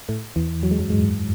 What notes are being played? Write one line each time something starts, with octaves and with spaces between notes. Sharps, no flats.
A2 A3
E2 E3
F#3
G#3
F#2 F#3
G#2 G#3